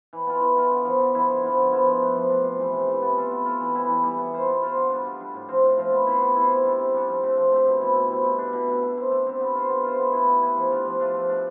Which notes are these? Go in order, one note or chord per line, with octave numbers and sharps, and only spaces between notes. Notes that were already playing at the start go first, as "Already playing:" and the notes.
E3
B3 F4
E3
B3 F4
D3
F3 B3 E4
D3
F3 B3 E4
D3
F3 B3 E4
D3
F3 B3 E4
F3
A3 D4
F3
A3 D4
C3
E3 A3
C3
E3 A3
B3
F4 A4
B3
F4 A4
E3
G3 B3 E4
E3
G3 B3 E4
B3
F4 C5
B3
F4 C5
D3
G3 D4
D3
G3 D4
A2
F3 C4 F4
A2
F3 C4 F4
B3
E4 G4 C5
B3
E4 G4 C5
C3
G3 D4 A4
C3
G3 D4 A4
F3
A3 C4 G4
F3
A3 C4 G4
B2
G3 C4 E4
B2
G3 C4 E4
B2
A3 D4
B2
A3 D4
A3
C4 G4
A3
C4 G4
B3
F4 C5
B3
F4 C5
B3
E4 G4 B4
B3
E4 G4 B4
F3
A3 D4 F4
F3
A3 D4 F4
F3
A3 D4